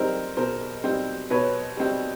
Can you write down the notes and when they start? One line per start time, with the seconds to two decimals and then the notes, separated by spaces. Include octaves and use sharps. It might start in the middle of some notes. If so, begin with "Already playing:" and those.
Already playing: G3 C4 D#4 A#4 C5
0.37 B2 A#4 C5
0.84 G3 C4 D#4
1.30 B2 B4 C#5
1.77 G3 C4 D#4